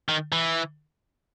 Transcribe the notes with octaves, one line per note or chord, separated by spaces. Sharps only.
D#3
E3